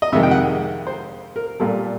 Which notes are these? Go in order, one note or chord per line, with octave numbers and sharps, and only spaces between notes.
D#5
F2 C3 D#3 G#3 E5
G5
F#5
C5
A#4
A#2 G3 A4